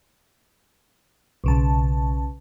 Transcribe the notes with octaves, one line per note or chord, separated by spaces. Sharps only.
B1 C#3 A5